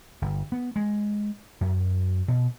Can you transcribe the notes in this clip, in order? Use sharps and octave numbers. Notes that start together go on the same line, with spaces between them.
G1
B3
G#3
F#2
B2